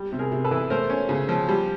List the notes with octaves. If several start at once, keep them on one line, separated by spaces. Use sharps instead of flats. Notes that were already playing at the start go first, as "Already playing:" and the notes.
Already playing: G3
C3
G#4 A#4
C3
A4 B4
E3
A3 A#4 C5
C#4
C#3
F3
G3